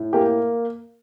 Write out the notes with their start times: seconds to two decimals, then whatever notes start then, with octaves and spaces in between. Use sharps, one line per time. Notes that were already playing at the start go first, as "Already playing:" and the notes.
Already playing: A2
0.13 A#3 G4